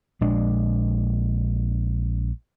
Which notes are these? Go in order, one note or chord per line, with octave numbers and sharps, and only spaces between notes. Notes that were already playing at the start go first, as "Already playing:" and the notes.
A#1 G#3 D4